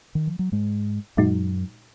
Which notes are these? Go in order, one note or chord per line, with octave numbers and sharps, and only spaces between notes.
D#3
F3
F#3
G#2 G#3
F#2 A#2 F#3 G#3 D#4 F#4